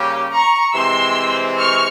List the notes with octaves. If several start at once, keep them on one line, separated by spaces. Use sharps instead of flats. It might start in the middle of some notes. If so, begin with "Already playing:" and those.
Already playing: C#3 G3 A#3 C#4 G4
A#5 C#6
C3 E3 G#3 C4 C6 E6
C#6 F6